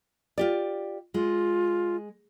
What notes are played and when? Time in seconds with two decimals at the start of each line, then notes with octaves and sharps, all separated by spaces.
0.38 F4 G4 D5
1.14 G#3 F4